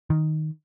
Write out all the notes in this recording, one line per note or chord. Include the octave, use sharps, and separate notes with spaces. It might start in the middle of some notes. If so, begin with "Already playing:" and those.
D#3